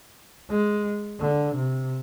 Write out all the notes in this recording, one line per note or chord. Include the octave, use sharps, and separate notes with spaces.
G#3
D3
C3